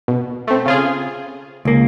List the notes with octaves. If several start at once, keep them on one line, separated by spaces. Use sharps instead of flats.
B2
A3 C4
C#3 F4 G#4
C#2 A#3